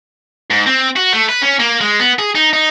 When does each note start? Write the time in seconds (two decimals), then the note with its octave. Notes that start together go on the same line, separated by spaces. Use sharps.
0.50 G#2
0.66 C4
0.96 F#4
1.13 A3
1.29 B4
1.42 C#4
1.60 A#3
1.81 G#3
1.99 B3
2.19 G#4
2.35 D#4
2.53 D#4